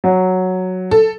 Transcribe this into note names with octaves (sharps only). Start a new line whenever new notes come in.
F#3
A4